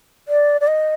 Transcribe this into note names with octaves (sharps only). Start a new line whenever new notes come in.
D5
D5
D#5